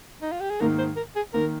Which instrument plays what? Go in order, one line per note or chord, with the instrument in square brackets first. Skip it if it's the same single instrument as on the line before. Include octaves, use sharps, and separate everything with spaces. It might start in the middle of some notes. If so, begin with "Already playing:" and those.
[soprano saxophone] D#4
F4
G4
G#4
[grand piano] G#2 D#3 A#3 [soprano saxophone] A#4
[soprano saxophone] C5
A#4
G#4
[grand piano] D#3 A#3 [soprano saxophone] A#4